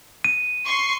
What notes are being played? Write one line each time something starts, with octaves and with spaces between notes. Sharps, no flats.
D#7
C6 C#6 C7